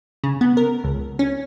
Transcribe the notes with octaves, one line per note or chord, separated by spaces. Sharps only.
C#3
B3
A#4
C#2
C#4